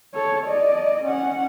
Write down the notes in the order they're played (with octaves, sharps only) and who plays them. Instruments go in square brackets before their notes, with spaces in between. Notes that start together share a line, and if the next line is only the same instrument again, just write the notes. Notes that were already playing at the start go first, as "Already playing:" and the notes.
[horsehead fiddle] A4 C#5
D5 D#5
C#4 F#5